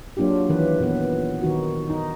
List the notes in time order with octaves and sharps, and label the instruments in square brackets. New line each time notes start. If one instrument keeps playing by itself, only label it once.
[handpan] F#3 A#3 D4 F4 G4
D#3 E3 B4
A#2 E3 B3 B4
D#3 D#4 F#4
D#4